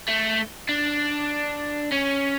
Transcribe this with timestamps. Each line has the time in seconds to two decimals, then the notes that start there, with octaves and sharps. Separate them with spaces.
0.08 A3
0.69 D4
1.92 C#4